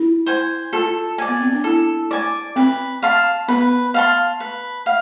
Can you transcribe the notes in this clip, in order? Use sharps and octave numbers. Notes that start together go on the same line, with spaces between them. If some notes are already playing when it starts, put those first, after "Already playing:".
Already playing: E4
C5 G#5
F4 A4
D5 G#5
B3
C4
D4
E4 A4
D5 G#5
C4 B4
F5 A5 C6
B3 B4
F5 A5 C6
B4
F5